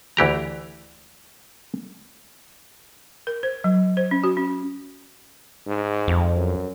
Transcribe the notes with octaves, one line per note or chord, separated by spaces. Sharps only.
D2 E3 G4 A#5
A#4
C5
F#3
C5
C#4
F#4
C#4
G#2
F2
F#2